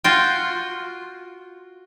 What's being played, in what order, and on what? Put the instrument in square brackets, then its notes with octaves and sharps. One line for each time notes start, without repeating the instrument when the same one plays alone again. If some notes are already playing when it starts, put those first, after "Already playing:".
[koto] F4 F#4 G5